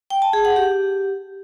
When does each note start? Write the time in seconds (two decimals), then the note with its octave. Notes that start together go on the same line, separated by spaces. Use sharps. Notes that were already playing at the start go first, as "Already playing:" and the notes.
0.10 G5
0.22 A5
0.33 G#4
0.45 F#5
0.56 G4